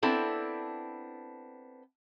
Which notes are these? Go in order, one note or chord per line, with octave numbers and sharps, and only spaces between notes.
B3 C4 D4 E4 A4